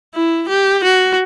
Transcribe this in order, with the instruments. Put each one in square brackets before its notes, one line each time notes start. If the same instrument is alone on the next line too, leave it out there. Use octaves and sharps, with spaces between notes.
[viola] E4
G4
F#4